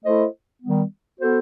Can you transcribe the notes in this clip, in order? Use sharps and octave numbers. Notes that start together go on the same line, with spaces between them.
A3 E4 A4 C5 D#5
D#3 G3 B3
B3 F#4 A4 C5